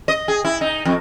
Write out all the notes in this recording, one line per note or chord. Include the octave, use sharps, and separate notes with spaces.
D#5
G#4
E4
D#4
F2